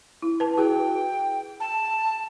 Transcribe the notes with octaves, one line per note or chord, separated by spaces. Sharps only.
E4
B4 A5
E4 F#4 G#4 G5
A5